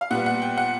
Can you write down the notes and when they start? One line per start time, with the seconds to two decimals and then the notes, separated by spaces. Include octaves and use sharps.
0.01 F5
0.10 A#2 G3 B3 F#5
0.26 F#5
0.42 G5
0.57 F#5